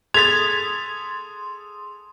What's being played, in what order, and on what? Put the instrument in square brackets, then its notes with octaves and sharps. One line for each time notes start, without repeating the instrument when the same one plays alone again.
[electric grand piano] G#4 A4 B6 [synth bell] C6 D#6 [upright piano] G#6 A6 [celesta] F7